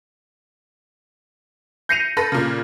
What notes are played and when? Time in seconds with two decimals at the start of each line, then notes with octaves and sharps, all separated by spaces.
1.89 G6 A#6 C7 C#7 D#7 F7
2.17 A4 B4 B5 A#6
2.32 A#2 C#3